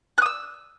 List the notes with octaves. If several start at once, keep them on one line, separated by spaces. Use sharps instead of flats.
D#6 E6 F#6